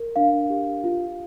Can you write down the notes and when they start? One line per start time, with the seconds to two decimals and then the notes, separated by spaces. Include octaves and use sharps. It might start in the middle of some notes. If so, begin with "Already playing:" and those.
Already playing: A#4
0.16 D4 F5
0.50 G4
0.84 F4